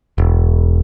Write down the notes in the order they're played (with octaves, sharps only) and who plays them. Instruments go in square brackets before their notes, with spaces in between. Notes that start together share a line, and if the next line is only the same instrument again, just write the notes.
[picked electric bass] E1